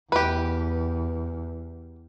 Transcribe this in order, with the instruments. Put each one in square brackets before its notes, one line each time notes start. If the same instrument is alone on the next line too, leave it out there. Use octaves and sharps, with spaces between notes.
[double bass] E2 [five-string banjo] G4 B4